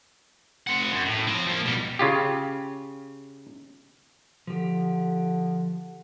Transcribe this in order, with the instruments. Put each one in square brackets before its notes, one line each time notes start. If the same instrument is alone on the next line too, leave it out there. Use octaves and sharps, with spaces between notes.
[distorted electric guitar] C4 F#5
F#2
A2
F3 C4
F3 A#3
B2 G3
[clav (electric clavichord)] C#3 F4 G4
[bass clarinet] D3 [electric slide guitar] F3 G4